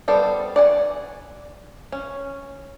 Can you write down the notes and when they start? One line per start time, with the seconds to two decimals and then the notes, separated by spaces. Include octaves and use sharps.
0.08 G3 B3 A4 C5 D5
0.56 D5 F#5 G#5
1.92 C#4